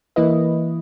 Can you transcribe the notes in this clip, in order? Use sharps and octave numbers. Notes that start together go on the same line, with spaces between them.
E3 A#3 E4 B4 D#5